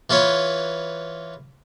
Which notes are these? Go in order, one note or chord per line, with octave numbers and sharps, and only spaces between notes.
E3 F4 B4 C#5